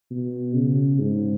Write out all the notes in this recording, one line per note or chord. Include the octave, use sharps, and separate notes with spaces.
B2
C#3
G#2